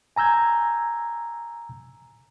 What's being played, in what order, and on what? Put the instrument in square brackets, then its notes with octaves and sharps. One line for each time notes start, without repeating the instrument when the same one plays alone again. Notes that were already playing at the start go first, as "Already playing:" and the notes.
[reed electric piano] G#5 A#5 E6 G6 G#6